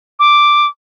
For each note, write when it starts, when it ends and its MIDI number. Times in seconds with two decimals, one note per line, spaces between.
0.20 0.67 86